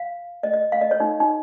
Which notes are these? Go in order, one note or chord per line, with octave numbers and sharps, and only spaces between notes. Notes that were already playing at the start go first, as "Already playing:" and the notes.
Already playing: F5
D#5
D#5
F5
D#5
C#5
D#4
D#4